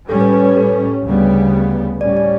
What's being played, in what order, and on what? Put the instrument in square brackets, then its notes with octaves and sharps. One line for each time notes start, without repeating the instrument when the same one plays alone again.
[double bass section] A2 G3 C#4 [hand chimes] A4
[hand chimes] B4
B4
B4
A4
[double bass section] D2 C#3 G3 B3
[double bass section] A2 G3 C#4 [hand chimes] D5
[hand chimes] D5